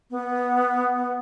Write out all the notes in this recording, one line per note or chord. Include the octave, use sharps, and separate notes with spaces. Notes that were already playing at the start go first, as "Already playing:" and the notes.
B3